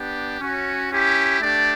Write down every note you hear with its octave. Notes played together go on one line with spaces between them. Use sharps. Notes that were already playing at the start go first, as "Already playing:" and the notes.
Already playing: B3 D4 G4
C#4 F#4
C#4 E4 G4
A3 D4 G4 D5